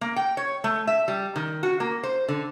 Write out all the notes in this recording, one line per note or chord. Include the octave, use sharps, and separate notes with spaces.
A#3
G5
C#5
A3
E5
G3
D#3
F#4
A#3
C5
D3